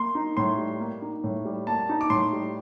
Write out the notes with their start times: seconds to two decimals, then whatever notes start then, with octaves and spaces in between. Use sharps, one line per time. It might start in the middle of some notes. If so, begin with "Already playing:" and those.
Already playing: A#3 C6
0.15 D#4
0.37 A2 C6
0.58 G3
0.80 A#3
1.02 D#4
1.24 A2
1.45 G3
1.67 A#3 A5
1.89 D#4
2.01 D6
2.10 A2 C6
2.33 G3